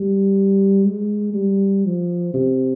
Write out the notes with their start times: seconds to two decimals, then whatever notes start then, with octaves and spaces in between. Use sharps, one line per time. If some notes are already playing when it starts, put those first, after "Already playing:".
Already playing: G3
0.85 G#3
1.34 G3
1.85 F3
2.34 C3